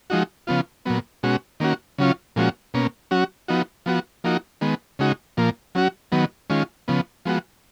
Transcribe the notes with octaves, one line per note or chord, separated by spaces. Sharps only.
F3 G#3 D#4 F#4
C#3 F3 B3 F4
A#2 F#3 B3
B2 G#3 C#4 F#4
D#3 A#3 C#4 F#4
C#3 F#3 C#4 F4
A#2 F3 G#3 C#4 F#4
B2 A#3 C#4
F#3 C#4 F#4
F3 B3 D#4 F#4
F3 B3 F#4
F3 A#3 D#4 F#4
D#3 G#3 B3
C#3 G#3 D#4 F#4
A#2 F3 A#3
F#3 C#4 F#4
D#3 F#3 B3
D#3 G#3 C#4 F4
C#3 F3 B3
F3 G#3 B3 F#4